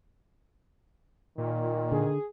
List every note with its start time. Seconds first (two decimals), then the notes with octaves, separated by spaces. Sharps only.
1.38 A#2 D#3
1.92 D3 G#4